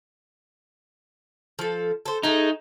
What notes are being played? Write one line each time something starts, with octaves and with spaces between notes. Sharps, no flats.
F3 A4
A4 C5
G#3 A3 D#4 G#4